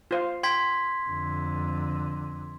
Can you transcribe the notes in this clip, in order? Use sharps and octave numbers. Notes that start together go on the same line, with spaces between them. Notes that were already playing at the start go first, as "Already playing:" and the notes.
F4 C5 F5
G5 C6 G#6 B6
F2 D3